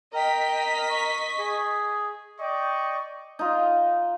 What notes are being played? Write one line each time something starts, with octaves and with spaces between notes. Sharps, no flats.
A#4 D#5 G5 B6
C#6
G#4
D5 D#5 G5 C#6
D#4 F4